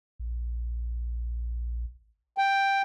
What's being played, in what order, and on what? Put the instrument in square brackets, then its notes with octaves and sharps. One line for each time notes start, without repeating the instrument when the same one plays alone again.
[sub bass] A#1
[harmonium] G5